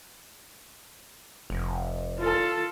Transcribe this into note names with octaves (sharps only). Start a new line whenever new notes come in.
F1
F4 A4